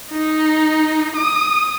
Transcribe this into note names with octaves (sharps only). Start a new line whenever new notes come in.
D#4
D#6